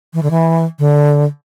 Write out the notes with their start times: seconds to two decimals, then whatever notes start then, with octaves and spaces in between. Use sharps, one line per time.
0.14 E3
0.23 D3
0.31 E3
0.79 D3